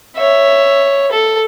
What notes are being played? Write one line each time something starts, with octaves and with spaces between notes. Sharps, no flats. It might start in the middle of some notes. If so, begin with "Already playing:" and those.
C#5 E5
A4